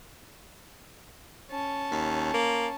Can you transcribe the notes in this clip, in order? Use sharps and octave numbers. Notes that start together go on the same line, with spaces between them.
C#4 A5
D#2
A#3